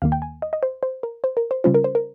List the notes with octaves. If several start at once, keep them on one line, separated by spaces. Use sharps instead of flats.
D#2 D#3 A#3 F5
G5
G#5
D#5
D#5
C5
C5
A#4
C5
A#4
C5
C#3 G3 C#4 F4 C5
A#4
C5
A#4